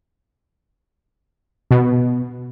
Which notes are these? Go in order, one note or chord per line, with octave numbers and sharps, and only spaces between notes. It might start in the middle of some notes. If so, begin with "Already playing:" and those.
B2